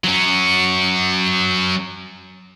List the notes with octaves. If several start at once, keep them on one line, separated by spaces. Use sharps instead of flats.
F#3 C#4